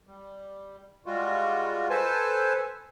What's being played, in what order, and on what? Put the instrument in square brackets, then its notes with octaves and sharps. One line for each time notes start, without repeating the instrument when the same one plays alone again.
[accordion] G3
G3 G#3 F4 F#4
A4 B4 C5 G#5 A5